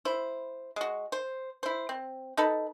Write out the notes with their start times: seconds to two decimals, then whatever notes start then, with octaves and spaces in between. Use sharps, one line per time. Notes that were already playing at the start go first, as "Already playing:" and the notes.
0.05 E4 C5
0.76 G#3 F#4
1.12 C5
1.63 E4 C5
1.89 C4
2.37 D#4 A4 B4